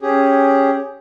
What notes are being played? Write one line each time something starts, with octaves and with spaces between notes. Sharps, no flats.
C#4 G4 G#4